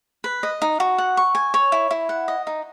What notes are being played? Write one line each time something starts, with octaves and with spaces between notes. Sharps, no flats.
B4
D#5
D#4
F#4
F#5
C#6
G#5
C#5
E4
E4
F#5
D#5
D#4